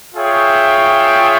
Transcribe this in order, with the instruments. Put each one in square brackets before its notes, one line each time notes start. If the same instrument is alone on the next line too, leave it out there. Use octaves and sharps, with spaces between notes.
[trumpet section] F4 G#4 C#5 E5 G5